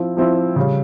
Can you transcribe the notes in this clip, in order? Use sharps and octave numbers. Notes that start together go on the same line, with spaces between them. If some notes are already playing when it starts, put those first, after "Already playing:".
Already playing: F3 C4 E4
F3 C4 E4
C#3 G3 C#4